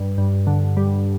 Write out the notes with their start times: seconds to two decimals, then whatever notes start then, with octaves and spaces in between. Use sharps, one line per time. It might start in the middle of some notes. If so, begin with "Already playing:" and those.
Already playing: G2
0.18 G2
0.47 D3
0.77 G3